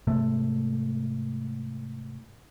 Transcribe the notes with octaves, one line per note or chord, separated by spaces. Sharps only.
G#2 C3 A3